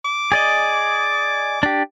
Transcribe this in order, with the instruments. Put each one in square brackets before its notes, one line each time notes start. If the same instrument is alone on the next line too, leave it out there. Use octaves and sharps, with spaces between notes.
[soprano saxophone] D6
[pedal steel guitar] G#4 D5 D#5
D4 G4